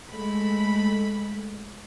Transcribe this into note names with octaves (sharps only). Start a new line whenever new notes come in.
G#3 A3 B5